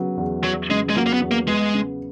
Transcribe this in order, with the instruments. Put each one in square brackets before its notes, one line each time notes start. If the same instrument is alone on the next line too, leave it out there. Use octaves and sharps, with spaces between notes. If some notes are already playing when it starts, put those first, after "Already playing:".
Already playing: [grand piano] C#3 F#3 B3
E2
[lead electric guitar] F#3 [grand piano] B3
[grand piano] C#3 [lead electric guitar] G#3
[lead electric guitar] G#3
[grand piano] F#3 [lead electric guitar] A#3
[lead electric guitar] A#3
B3
[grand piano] E2
[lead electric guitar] A#3
[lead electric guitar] G#3 [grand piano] B3
[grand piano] C#3